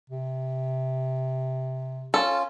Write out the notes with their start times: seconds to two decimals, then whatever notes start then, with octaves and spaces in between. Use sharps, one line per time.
0.10 C3
2.14 C#4 F4 A4